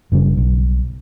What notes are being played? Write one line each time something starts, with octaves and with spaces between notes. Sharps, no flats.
F#1 C#3 G3
B1